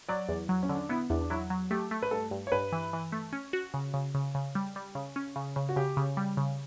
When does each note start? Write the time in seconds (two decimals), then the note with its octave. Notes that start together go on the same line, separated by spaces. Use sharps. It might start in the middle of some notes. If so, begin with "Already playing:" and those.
0.09 F#3 D5
0.28 E2
0.49 F#3
0.63 C#4
0.69 D3
0.75 D4
0.89 B3 E4
1.10 E2 D4
1.21 D4
1.30 F#3 E4
1.50 F#3
1.71 A3 G4
1.91 A3
2.03 B4
2.11 G2 A4
2.31 G2
2.47 C#5
2.52 G2 B4
2.72 E3
2.93 E3
3.12 A3
3.33 C#4
3.53 F#4
3.74 C#3
3.94 C#3
4.14 C#3
4.35 C#3
4.55 G3
4.76 G3
4.95 C#3
5.16 C#4
5.36 C#3
5.56 C#3
5.69 F#4
5.76 C#3 G4
5.97 C#3
6.17 G3
6.37 C#3